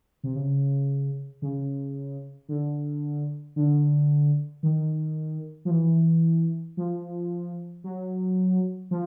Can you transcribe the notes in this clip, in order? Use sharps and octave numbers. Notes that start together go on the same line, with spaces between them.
C3
C#3
C#3
D3
D3
D#3
F3
E3
F3
F#3
F3